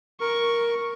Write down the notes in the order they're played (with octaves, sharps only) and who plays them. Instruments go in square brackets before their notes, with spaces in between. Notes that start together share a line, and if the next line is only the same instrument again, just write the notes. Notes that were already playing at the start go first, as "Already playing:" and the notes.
[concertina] A#4 [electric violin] C#6